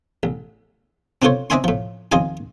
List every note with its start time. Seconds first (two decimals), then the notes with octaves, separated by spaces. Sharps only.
0.23 A1
1.22 C4 D4 F4 A4 C5 C#5
1.50 C4 D4 D#5 E5 G#5 C6
1.64 A2 F3
2.12 D#2 F3 C4 D#5 F5 G#5